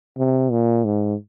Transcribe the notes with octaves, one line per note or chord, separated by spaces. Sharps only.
C3
A#2
G#2